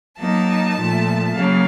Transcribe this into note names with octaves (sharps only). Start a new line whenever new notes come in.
F#3 A#3 D#4 A5
A#2 F3 A3
C#3 F#3 A#3 C#4 F5